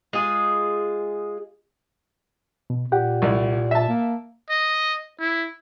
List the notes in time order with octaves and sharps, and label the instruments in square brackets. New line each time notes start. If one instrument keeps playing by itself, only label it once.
[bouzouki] G#3 F4 G#4
[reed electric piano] B2
[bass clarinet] A#2 [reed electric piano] G4 F#5 G5
[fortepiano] C2 D5
E5 A5
[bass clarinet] A#3
[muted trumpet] D#5
E4